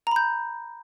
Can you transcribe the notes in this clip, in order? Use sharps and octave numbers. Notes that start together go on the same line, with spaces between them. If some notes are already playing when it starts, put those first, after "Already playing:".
A#5 B5 G6